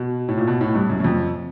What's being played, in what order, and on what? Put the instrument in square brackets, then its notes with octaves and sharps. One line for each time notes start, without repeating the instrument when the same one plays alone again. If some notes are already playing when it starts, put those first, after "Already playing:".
Already playing: [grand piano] B2
A2
A#2
B2
A2
G2
F#2
F#2
F2